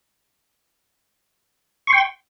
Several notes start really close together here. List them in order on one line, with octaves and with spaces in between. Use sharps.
C#6 C6 G5